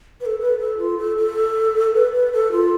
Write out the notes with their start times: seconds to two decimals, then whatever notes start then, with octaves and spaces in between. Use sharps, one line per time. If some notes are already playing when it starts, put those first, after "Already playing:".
0.21 B4
0.26 A4
0.39 B4
0.59 A4
0.78 F4
0.98 A4
1.17 A4
1.94 B4
2.13 B4
2.32 A4
2.52 F4